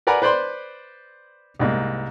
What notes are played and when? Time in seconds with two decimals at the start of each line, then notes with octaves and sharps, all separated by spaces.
0.07 A#4 B4 D5 F#5 G#5 A#5
0.22 B4 C5 D5 B5 C6
1.59 C2 G#2 A#3